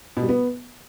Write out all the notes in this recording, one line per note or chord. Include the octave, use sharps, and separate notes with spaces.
B2
G3
B3